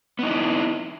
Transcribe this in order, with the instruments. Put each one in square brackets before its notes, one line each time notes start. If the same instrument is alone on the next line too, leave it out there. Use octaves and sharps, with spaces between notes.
[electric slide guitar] B3
D#4
E4